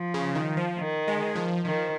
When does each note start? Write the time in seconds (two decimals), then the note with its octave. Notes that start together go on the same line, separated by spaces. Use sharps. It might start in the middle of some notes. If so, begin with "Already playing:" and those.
Already playing: F3
0.14 C#3
0.35 D#3
0.57 F3
0.79 D#3
1.08 G#3
1.35 F3
1.65 D#3 F3